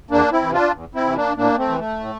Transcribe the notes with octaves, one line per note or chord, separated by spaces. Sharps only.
E2 A#3 D4
C4 E4
C3 E3
D4 F4
E2
C4 E4
C3 E3
A#3 D4
A2 A#3 D4
A3 C4
E3
A3
A2